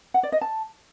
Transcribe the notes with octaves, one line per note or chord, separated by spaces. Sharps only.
F#5
D5
D#5
A5